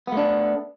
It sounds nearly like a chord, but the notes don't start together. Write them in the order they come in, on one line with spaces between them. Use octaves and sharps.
B3 A3 D4